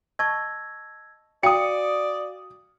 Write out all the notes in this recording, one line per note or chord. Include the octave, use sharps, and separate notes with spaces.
D#5 A5 C#6 E6 G#6 A#6
F#4 D5 F5 G5 D#6 C#7